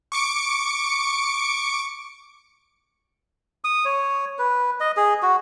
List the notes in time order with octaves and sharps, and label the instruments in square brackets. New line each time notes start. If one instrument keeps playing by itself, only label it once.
[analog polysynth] C#6 D6 C#7 D7
[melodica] D#6
C#5
B4
D#5
G#4
F#4